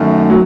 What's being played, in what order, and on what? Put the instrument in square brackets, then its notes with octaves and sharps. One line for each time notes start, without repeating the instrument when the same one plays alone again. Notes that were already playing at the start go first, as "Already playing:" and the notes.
Already playing: [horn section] F#2 D#3 A3
[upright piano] F#3